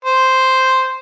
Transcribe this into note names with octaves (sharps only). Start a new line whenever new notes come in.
C5